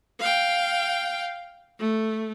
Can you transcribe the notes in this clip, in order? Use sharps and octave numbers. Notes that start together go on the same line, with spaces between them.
F5 G5
A3